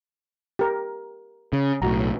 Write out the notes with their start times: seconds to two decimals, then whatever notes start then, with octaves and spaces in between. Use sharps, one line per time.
0.59 G4 A#4
1.53 C#3
1.82 B1 A2 F#4 A#5